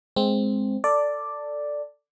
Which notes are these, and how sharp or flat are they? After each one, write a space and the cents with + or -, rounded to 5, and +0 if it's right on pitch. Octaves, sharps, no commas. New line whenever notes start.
G#3 +10 C4 +0
A4 +15 D5 +0